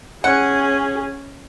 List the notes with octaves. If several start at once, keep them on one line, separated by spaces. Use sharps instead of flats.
C#4 G#4 F#5